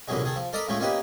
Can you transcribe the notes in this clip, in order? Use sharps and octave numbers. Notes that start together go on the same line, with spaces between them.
C2 A#2 D3 E3 F#3 G#3
D#3 G#4 A4
F3
A4 A#4 D5 D#5 A#5 B5
A2 C#3 F3 G#3 A3
A#3 C#4 D#4 G4 B4